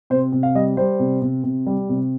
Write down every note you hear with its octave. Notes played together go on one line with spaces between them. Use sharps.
C3 C5
C3
F5
G3 D#5
G3 C5
C3
C3
C3
G3
C3